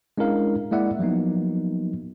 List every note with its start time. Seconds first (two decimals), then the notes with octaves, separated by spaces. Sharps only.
0.18 G#3 C#4 D4 E4 A#4 F5
0.72 G#3 A#3 E4 D5 E5 F#5
0.99 F3 F#3 A#3 B3 D#4